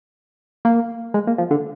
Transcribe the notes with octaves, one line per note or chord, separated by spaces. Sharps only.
A#3
G#3
A#3
F3
D3